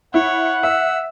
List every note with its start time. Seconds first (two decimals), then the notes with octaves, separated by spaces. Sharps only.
0.14 E4 C#5 F#5
0.63 E5 E6